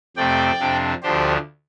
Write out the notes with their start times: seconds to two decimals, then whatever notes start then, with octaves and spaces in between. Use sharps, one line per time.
0.17 F2 C3 A3 C4 D5 G5
0.60 F2 C3 F3 D4
1.03 D2 D3 F3 D4 G4 C5